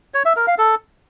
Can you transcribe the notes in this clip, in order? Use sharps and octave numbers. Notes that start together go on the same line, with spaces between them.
C#5
E5
A#4
F5
A4